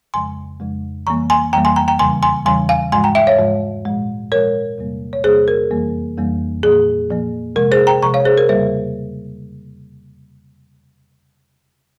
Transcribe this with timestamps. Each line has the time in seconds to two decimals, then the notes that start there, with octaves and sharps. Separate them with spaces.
0.14 F2 C#3 F3 G#3 G#5 C6
0.60 F2 C#3 F3 G#3
1.07 F2 E3 G3 A#3 A#5 C#6
1.30 G#5 C6
1.53 F2 E3 G3 A#3 G5 A#5
1.65 G#5 C6
1.76 G5 A#5
1.88 G5 A#5
1.99 E2 C#3 E3 G3 G#5 C6
2.23 G#5 C6
2.46 E2 C#3 E3 G3 G#5 C6
2.69 F5 G#5
2.92 G#2 F3 G#3 G#5 C6
3.04 G5 A#5
3.15 E5 G5
3.27 C#5 F5
3.39 G#2 F3 G#3
3.85 A#2 F3 G#3
4.31 A#2 F3 G#3 A#4 C#5
4.78 E2 C3 G3 A#3
5.13 C#5
5.24 E2 C3 G3 A#3 G#4 C5
5.48 A#4
5.71 F2 E3 G3 A#3
6.17 F2 E3 G3 A#3
6.63 A#2 F3 A#3 G#4
7.10 A#2 F3 A#3
7.56 C3 F3 G#3 A#4
7.72 G#4 C5
7.87 G5 A#5
8.03 C3 F3 G#3 A#5 C#6
8.14 C#5 F5
8.25 G#4 C5
8.38 A#4
8.49 E2 C#3 G3 A#3 C5 E5